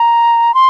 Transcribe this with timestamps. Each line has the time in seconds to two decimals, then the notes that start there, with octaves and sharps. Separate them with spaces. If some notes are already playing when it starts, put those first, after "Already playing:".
Already playing: A#5
0.54 C6